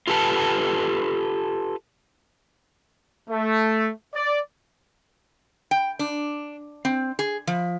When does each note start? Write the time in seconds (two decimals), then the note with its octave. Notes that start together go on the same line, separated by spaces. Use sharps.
0.07 F4 G4 A4 B4 A5
3.30 A3
4.14 D5
5.71 G5
5.99 D4
6.85 C4
7.19 G#4
7.47 F3